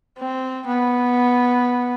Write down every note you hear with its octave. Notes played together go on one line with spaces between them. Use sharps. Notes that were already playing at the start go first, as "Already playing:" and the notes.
C4
B3